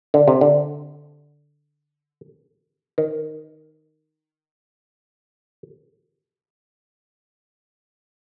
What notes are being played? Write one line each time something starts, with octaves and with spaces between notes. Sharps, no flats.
D3
C3
D3
D#3